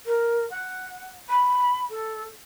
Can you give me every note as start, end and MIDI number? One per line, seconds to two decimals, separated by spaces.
0.06 0.46 70
0.50 1.09 78
1.29 1.80 83
1.90 2.24 69